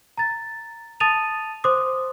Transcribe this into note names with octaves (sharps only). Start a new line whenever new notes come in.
A#5 A6
A5 D#6 A6 D#7 F7
C5 C6 D6 D#6